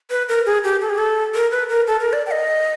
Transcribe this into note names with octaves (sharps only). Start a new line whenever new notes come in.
B4
A#4
G#4
G4
A4
G#4
A4
A#4
B4
A#4
A4
A#4
D5
G5
D#5